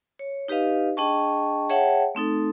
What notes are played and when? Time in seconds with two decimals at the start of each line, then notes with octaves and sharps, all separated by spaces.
0.19 C#5
0.48 D#4 G4 B4 D#5 F5
0.97 D4 G#4 D#5 G5 A5 C#6
1.70 G#4 C#5 E5 F#5 G5 A5
2.15 A3 C4 D#4 A4